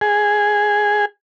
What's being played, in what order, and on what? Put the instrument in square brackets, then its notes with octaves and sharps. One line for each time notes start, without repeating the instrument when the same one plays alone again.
[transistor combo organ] G#4